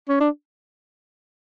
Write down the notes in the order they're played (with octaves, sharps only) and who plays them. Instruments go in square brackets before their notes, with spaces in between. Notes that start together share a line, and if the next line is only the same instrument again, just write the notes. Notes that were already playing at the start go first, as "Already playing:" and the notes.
[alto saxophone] C#4
D4